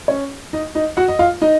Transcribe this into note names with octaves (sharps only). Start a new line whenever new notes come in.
C#4 C#5
D#4 D#5
D#4 D#5
F#4 F#5
D#5
F4 F5
D#4 D#5